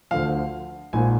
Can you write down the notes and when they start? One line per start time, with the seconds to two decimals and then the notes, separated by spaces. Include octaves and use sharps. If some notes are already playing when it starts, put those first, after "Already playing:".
0.11 D2 D3 F3 F5
0.93 A#1 G#2 F3 A#3 G#5